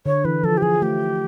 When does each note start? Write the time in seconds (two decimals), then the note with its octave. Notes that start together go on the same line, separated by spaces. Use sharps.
0.06 D3 C#5
0.25 E3 B4
0.43 F3 A4
0.57 G4
0.62 F3 G#4
0.82 A3 G4